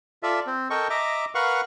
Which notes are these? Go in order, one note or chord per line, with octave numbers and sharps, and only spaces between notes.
F4 A4 D5 E5
C4
A4 A#4 D#5 G5 C#6
D#5 E5 A#5 D6
A#4 B4 F5 F#5 C#6